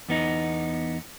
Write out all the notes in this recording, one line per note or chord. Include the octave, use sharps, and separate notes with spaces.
E2 B3 D#4